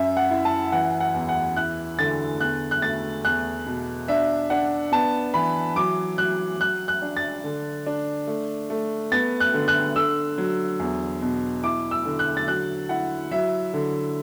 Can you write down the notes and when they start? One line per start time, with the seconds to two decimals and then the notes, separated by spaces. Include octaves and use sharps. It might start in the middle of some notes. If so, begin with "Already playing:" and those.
Already playing: F#2 E5
0.17 F#5
0.31 E4
0.45 A5
0.72 E3 F#5
1.00 F#5
1.14 E2
1.29 F#5
1.57 E4 F#6
1.99 D3 A6
2.40 E2 F#6
2.71 F#6
2.82 A3 A6
3.25 E2 F#6
3.67 B2
4.08 D4 E5
4.50 D4 F#5
4.92 B3 A5
5.34 E3 B5
5.76 F#3 D6
6.18 F#3 F#6
6.60 F#3 F#6
6.88 F#6
7.02 D4
7.17 A6
7.44 D3
7.87 D4
8.27 A3
8.70 A3
9.12 B3 A6
9.40 F#6
9.54 D3
9.68 F#6
9.96 D3 E6
10.38 F#3
10.80 E2
11.22 B2
11.64 E4 D6
11.91 E6
12.05 D3
12.19 F#6
12.37 A6
12.48 F#3 F#6
12.89 E4 F#5
13.31 F#3 E5
13.74 D3